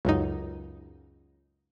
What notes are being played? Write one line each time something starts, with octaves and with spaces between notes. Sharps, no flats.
C#2 F#2 D#4